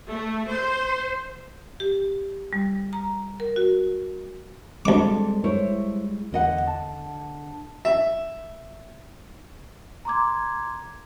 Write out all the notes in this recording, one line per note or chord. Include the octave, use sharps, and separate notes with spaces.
A3
C5
G4
G3
A#5
A#4
F#4
D2 G3 G#3 C4 A4 D6
E4 C5 C#5
E2 D3 D#5 F#5
A5
E5
A#5 C6 D6 G#6